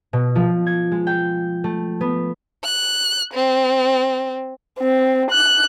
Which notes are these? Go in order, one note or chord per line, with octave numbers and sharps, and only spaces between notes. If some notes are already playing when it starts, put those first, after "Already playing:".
B2
F3
G#6
G#3
G5
A3
B3
F#6
C4
C4
F#6